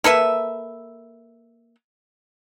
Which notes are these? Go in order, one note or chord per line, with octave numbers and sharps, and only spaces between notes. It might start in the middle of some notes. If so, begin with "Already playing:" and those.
A#3 A4 B4 E5